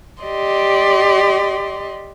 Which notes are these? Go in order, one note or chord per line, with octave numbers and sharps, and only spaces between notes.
G4 D5 D#5 C6